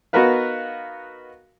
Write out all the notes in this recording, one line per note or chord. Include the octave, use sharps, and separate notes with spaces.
B3 D#4 F#4 A#4 B4 F5